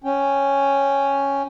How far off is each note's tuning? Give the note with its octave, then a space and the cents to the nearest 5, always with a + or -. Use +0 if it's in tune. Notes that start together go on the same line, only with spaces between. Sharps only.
C#4 +0 G5 +0